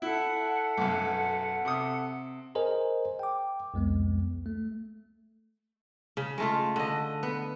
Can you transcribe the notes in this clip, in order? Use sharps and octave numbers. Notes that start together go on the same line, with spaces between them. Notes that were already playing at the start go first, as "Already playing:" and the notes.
E4 A4 E5 F#5
B1 F#2
C3 D#6
G#4 A#4 C5 D#5 G#5
G5 D6
C2 F2 G#3 B3
A3
C#3
G#3 A3 F4
D3 D#5
B3